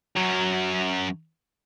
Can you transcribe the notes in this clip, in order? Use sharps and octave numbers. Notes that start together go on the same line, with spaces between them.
F#2 F#3